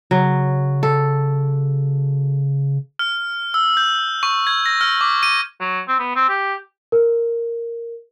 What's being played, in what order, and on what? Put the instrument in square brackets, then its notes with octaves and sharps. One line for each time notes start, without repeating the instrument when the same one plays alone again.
[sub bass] C#3 [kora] F#3
[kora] A4
[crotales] F6
E6
G6
C#6
G#6
A#6
F6
D6
D#7
[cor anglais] F#3
C4
B3
C4
G4
[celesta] A#4